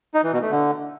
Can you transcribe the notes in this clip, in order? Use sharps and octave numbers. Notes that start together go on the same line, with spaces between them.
D#4
E3
B2
A3
D3